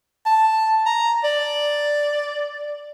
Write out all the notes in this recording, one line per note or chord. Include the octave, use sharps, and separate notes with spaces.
A5
A#5
D5